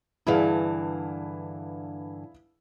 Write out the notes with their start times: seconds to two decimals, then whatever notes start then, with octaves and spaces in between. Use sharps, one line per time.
0.27 G2 D3 E3 E4 G#4 F5